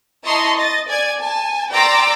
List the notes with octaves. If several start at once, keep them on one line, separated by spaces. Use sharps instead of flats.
E4 D#5 A5 A#5 C6 C#6
D#5 A6
D5 G#5 G#6
G#5 A5
D5 G5 A#5 C6 D6 E6